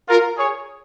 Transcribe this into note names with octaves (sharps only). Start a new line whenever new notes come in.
F4 A#4
G#4 C#5